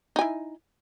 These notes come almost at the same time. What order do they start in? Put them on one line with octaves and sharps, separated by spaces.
D#4 G#5 E4